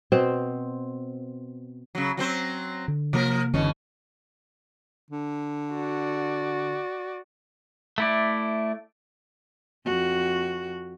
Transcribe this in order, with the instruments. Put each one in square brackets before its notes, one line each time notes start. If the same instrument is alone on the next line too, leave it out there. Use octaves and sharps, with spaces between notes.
[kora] B2 C4 C5
[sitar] C#3 F#3
F#3 C4 C5
[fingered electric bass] D3
[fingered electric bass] C3 A#3 [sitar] F3 A#4
[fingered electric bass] F#1 D3 E3 [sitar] G#2 B2 C#4
[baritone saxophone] D3
[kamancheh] F#4 D5
[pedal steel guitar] A3 E4 D5
[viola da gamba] F2 F#4